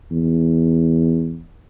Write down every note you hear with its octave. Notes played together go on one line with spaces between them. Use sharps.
E2